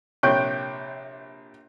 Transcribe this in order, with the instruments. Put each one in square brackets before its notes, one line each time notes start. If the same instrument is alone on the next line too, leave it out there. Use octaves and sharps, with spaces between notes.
[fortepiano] A#1 C3 [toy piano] C#5 G5 C#6 [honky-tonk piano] F#6 G6 D7